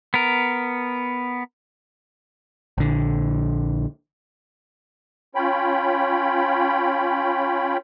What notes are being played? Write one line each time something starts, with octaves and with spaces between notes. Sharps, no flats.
B3 A#4
A#1 D3
C#4 F4 C#5 G5 B5